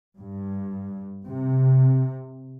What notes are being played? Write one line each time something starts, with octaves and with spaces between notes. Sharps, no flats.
G2
C3